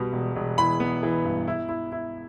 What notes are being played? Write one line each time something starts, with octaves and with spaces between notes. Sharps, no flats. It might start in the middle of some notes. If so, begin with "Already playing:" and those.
Already playing: B2 G3
E1
E1
E3 B5
B3
E3
G2
E4
E4
E4